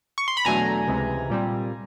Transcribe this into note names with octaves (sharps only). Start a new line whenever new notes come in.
C#6
C6
B5
E2 B2 F#3 A3 D4 G#5 A#5
C#2 C3 E3 G#3
A#2 G3 C4